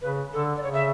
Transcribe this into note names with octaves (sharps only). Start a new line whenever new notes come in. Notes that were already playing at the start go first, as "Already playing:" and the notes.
C#3 B4
D3 A4
D5
C#3 C#5
E5